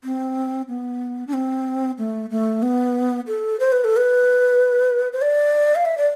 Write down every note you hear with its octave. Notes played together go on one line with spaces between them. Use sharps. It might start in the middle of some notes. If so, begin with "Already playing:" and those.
C4
B3
D4
C4
A3
A3
B3
A4
C5
B4
A4
B4
C5
D5
F5
E5
D5